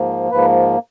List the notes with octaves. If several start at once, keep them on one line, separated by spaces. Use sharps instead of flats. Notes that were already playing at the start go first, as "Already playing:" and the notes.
Already playing: G#2 F3 A#3
G#2 F3 A#3 B4